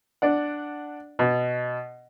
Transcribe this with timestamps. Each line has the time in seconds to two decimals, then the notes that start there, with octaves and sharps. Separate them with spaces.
0.22 D4 D5 F#5
1.19 B2